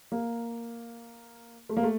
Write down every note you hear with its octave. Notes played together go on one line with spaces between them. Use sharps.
A#3
A3
A#3
A3